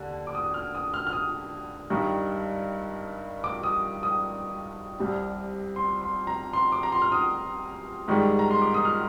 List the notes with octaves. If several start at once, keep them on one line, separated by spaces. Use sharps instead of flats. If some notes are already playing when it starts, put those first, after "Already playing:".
Already playing: D#2 D3
D6
D#6
F6
D#6
F6
F6
D#6
G2 D#3 G3
D6
D#6
D#6
C2 C3 G3
C6
C6
A#5
C6
D6
A#5
C6
F6
D#6
G#2 D#3 G3
A#5
C6
D6
D#6
F6